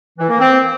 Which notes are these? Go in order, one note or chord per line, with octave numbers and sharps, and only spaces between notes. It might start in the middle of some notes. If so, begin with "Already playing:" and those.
E3
A#3
C4